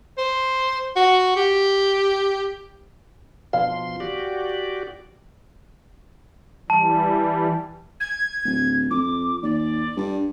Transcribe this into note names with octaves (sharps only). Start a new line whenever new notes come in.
C5
F#4
G4
B2 F3 F5 C6
F#4 G4 D5
E3 G3 A5
G#6
D1
F2 D6
D#2 D5
G2